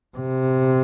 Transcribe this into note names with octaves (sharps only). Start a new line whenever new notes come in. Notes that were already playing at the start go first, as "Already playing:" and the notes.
C3